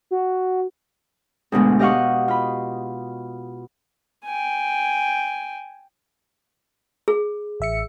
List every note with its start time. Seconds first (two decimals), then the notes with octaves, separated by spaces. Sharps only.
0.11 F#4
1.52 D2 G#2 B2 G#3
1.79 G4 D#5 F5 F#5 C#6
2.28 F4 B5
4.25 G5 G#5
7.08 G#4
7.60 A1 E5 C#7